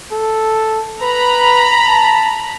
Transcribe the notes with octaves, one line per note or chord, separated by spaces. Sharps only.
A4
B4 A#5 B5
A5